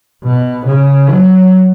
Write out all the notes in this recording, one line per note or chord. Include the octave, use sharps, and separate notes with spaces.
B2
C#3
F#3